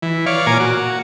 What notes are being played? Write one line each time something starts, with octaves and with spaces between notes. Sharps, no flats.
E3
C#5 D5 F5
A#2 A#4 G#5 D6
F#4